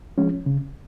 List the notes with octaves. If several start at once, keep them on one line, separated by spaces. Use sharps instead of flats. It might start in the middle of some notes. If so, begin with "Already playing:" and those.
F3 G#3 C#4
C#3